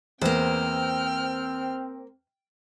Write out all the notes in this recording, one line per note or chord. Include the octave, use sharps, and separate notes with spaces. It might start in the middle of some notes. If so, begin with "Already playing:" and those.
E2 A#3 C4 C5 G5 F6